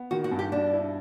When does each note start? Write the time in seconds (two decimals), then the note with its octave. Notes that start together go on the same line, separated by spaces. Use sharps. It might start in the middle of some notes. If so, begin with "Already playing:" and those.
Already playing: B3
0.11 D#3 F#4
0.24 F#4
0.31 G2
0.39 G4
0.52 B2 D4
0.73 E4